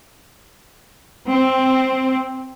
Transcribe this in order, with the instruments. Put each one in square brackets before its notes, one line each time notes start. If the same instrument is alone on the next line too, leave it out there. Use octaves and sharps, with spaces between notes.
[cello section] C4